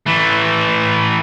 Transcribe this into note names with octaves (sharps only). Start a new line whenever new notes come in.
E3 A3